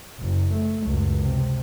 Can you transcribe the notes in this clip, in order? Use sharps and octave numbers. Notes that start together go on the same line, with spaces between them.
F#1
A3
C#2 F#2
C3